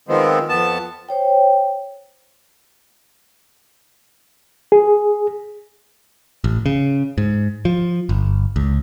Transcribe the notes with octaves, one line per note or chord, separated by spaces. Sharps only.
D#3 F3 G#3 B3 C4
F2 B3 A5
C5 C#5 G5
G#4
A1
C#3
G#2
F3
G1
C#2